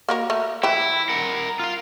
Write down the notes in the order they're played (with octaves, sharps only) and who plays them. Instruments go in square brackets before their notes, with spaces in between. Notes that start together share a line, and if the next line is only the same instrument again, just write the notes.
[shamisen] A#3 F#4 A#4
A3
[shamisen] E3 G5 [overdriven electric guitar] E4
[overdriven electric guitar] A#4 F#5
F4 F5